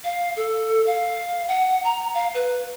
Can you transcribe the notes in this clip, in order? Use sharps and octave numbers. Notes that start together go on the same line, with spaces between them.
F5
A4
F5
F#5
A#5
F5
B4